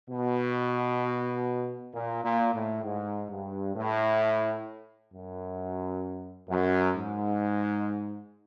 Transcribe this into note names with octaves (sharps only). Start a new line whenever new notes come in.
B2
A#2
A#2
A2
G#2
G2
A2
F#2
F#2
G#2